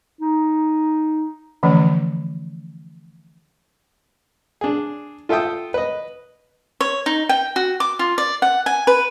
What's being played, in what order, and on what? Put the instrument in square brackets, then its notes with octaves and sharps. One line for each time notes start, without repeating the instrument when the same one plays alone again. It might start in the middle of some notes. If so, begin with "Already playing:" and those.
[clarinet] D#4
[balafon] D3 E3 F3 A3 C#4
[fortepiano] D4 G#4
F4 A4 E5 G5 D#6
B4 D#5
[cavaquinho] C#5
D#4
G5
F#4
D6
F4
D5
F#5
G#5
B4